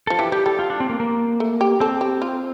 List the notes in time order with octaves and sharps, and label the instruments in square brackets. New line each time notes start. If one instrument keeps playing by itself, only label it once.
[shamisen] F3 [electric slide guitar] A4
[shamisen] E3 [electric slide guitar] G4
[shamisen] G3 [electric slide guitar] G4
[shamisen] G3 [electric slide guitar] A4
[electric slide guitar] F4
D4
C4
A#3
A#3
[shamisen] A3
G4
[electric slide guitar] C4 [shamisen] A4
[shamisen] G4
F4